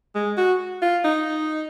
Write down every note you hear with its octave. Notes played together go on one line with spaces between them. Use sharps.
G#3
F#4
F4
D#4